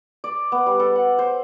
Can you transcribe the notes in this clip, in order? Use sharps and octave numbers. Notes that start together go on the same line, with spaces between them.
D5
B3
G3
A4
F#5
C5